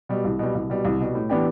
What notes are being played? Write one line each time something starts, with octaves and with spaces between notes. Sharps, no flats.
B2 G3
C2
B2 G3
C2
B2 G3
C2
B2 G3
A2
E3 B3 D4 G4